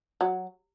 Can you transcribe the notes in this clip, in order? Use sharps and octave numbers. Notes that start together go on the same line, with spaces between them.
F#3